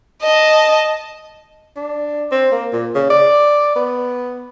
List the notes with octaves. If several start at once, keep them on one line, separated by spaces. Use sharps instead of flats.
D#5 A5
D4
C4
A#3
A#2
C#3
D5
B3